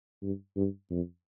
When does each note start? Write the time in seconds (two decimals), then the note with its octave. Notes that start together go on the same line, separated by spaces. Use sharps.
0.22 G2
0.56 G2
0.90 F2